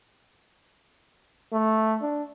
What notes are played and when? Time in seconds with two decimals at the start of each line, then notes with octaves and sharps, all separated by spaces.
1.53 A3
2.02 D4